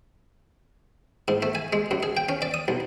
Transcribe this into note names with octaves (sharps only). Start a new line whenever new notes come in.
G#2
A3
G#5
G#3
F#2
G#4
G5
C#4
D5
D#6
B1